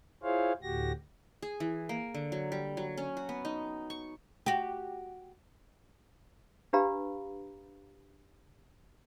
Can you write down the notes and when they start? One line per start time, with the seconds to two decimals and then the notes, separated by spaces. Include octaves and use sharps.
0.23 E4 F4 G#4 C5 C#5 F5
0.63 D2 A2 F#4 G4 A#6
1.42 G#4
1.60 E3
1.89 A#3
2.14 D3
2.32 F#3
2.52 G3
2.77 F#3
2.97 C#4
3.17 F#4
3.29 B3
3.45 D#4
3.90 C#6
4.46 F#4 G4
6.73 D4 G4 B4 F5 A#5 B5